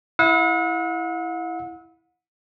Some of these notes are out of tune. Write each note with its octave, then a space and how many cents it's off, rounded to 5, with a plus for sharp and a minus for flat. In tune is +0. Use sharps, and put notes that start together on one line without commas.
E4 +0 F#5 -40 E6 -35